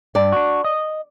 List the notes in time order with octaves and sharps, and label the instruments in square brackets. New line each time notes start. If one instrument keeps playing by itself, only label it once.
[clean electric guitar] G2 [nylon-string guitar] D5
[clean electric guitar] D4 F#4
D#5